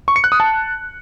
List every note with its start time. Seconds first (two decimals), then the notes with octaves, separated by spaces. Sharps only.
0.08 C#6
0.16 C#7
0.24 F#6
0.32 D#6
0.40 A5